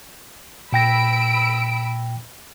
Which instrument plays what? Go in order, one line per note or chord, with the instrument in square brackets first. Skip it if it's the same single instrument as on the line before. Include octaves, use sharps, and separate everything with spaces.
[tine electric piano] A#2 G5 A#6 [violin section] B5 E6 D7